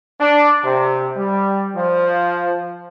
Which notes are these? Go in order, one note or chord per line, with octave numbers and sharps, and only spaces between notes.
D4
C3
G3
F3